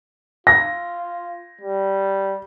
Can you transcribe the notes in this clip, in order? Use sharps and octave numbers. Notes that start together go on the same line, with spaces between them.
F4 A#6
G3